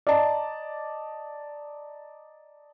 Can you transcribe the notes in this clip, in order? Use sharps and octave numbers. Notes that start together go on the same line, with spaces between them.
D5 D#5 A5 A#5